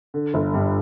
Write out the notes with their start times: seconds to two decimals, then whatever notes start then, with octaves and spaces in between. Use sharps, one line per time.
0.14 D3
0.34 G1
0.54 G2